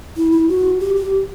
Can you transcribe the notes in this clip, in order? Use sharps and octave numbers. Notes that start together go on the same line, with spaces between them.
E4
E4
F#4
G4
G4